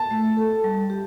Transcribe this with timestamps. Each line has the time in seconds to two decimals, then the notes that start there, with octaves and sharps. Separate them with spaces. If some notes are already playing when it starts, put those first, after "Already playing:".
Already playing: A5
0.11 A3
0.37 A4
0.64 G3
0.90 G4